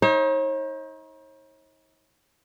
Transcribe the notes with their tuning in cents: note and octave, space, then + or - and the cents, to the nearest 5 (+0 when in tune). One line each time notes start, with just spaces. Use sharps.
D#4 +35 C#5 -40